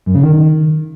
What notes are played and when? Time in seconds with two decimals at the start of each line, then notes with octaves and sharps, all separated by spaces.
0.06 F#2
0.15 C#3
0.23 D#3